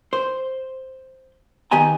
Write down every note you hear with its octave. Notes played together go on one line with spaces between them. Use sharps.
C5
D#3 B3 G4 D#5 G#5 A#5